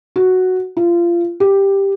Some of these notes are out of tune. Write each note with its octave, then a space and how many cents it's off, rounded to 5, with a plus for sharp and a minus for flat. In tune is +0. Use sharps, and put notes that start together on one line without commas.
F#4 +0
F4 -25
G4 +5